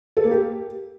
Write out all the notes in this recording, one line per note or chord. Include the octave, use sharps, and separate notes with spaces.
A4
A#3
G4